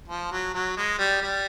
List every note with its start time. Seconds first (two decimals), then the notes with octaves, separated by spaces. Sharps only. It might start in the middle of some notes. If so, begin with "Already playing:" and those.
0.08 F3
0.32 F#3
0.54 F#3
0.77 G#3
0.99 G3
1.22 G3